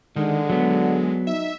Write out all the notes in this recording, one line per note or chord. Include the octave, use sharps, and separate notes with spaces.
D3 D#3 G#3
F#3 B3
D#4 E5